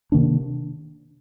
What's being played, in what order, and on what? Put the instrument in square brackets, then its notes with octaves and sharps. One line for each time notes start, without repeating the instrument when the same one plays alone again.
[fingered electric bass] C3 D#3 A#3 D4